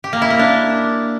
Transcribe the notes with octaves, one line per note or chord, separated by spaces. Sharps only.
G4
A#3
E4
A#3
D4